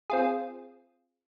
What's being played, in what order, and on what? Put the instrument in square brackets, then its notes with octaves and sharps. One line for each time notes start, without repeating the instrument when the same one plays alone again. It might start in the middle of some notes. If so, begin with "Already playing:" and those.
[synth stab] C4 F4 G#4